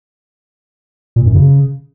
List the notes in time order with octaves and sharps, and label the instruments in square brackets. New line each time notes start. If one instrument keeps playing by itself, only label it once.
[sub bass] A#2
F#2
C#3